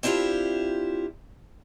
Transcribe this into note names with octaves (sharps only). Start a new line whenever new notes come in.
C4 D4 E4 F4 G4